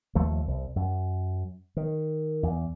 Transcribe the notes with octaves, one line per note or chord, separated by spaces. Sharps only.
D#2 F3 A3
C2
F#2
D#3
E2